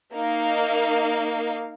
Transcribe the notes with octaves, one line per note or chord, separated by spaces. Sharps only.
A#3 D#4 F5